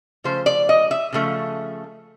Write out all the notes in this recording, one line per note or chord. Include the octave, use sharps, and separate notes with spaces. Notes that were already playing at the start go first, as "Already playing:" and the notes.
C#3 F3 A3 C5
D5
D#5
E5
C#3 F3 A3